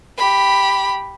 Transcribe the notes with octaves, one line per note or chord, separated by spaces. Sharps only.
G4 B5